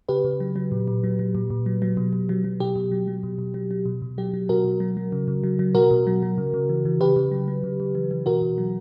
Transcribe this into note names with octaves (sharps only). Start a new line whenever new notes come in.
C#3 G4 B4
C#3
F#3
F#3
A#2
A#2
F#3
F#3
A#2
A#2
F#3
F#3
B2
B2
F#3
F#3
B2 G4
B2
F#3
F#3
B2
B2
F#3
F#3
B2
B2
F#3 G4
F#3
B2 F#4 A#4
B2
F#3
F#3
C#3
C#3
F#3
F#3
B2 F#4 A#4
B2
F#3
F#3
C#3
C#3
E3
E3
C#3 G4 B4
C#3
F#3
F#3
C#3
C#3
E3
E3
B2 F#4 A#4
B2
F#3